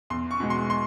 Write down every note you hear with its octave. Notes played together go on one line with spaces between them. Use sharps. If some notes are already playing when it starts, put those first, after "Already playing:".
E2 C6
C#6
B2 G#3
C6
C6